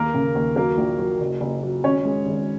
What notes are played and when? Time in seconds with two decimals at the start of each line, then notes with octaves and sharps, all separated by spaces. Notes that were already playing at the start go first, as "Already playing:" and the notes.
Already playing: D#2 A#3 A#4
0.14 C#3
0.35 D#2
0.56 F#3 A#3 A#4
0.78 A#1
0.99 F#3
1.21 F#1
1.41 F#1
1.63 F#3
1.84 G#1 C#4 C#5
2.05 G#3
2.26 G#1